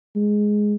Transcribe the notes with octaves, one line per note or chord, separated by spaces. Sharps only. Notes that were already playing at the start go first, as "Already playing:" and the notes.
G#3